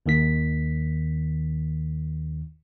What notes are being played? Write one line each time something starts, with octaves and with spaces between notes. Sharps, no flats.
D#2 D#3 B6